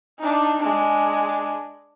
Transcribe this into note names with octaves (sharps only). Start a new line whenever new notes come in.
D4 D#4
G#3 D4